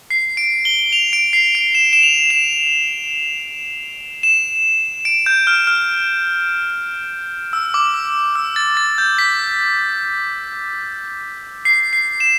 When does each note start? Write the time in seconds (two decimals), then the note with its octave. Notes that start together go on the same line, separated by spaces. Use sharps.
0.10 C7
0.37 D7
0.65 G7
0.93 F7
1.13 D7
1.33 C7
1.55 D7
1.75 E7
1.93 E7
2.03 F7
2.30 E7
4.23 E7
5.05 D7
5.26 G6
5.47 F6
5.67 F6
7.53 E6
7.74 D6
7.94 E6
8.35 E6
8.56 A6
8.77 A6
8.98 G6
9.19 B6
11.65 C7
11.93 C7
12.20 E7